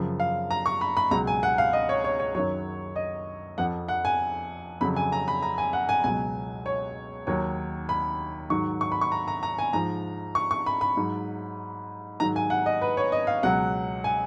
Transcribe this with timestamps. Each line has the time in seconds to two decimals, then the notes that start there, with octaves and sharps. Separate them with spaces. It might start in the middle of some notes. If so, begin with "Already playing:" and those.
Already playing: F#2 C#3 F3
0.20 F5
0.51 A#5
0.66 C#6
0.81 B5
0.97 B5
1.11 C#2 B2 F#3 A#5
1.27 G#5
1.43 F#5
1.58 F5
1.73 D#5
1.89 C#5
2.04 C#5
2.20 C#5
2.35 F#2 D#3 F#3 C#5
2.96 D#5
3.58 F2 F3 F#5
3.88 F#5
4.05 G#5
4.81 F2 C#3 F#3 B5
4.96 G#5
5.12 A#5
5.28 B5
5.42 A#5
5.58 G#5
5.73 F#5
5.89 G#5
6.04 C#2 B2 F#3 G#5
6.66 C#5
7.27 D#2 D#3 F#3 C#5
7.89 B5
8.50 G#2 D#3 F#3 C#6
8.81 C#6
8.92 B5
9.01 C#6
9.12 A#5
9.28 A#5
9.43 A#5
9.59 G#5
9.73 G#2 F3 A#5
10.35 C#6
10.51 C#6
10.66 B5
10.81 B5
10.97 G#2 F#3
12.20 G#2 D#3 F#3 A#5
12.36 G#5
12.50 F#5
12.66 D#5
12.82 B4
12.97 C#5
13.12 D#5
13.27 F5
13.43 C#2 B2 F#3 F#5
14.04 G#5